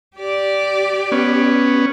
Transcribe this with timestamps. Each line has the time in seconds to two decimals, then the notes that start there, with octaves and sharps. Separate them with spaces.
0.17 G4 D5
1.12 B3 C#4